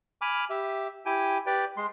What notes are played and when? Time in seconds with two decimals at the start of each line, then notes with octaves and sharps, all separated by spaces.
0.21 G#5 B5 D6 F6
0.50 G4 E5
1.06 E4 G4 G5 G#5
1.46 G4 B4 D5 G5
1.77 G#3 C6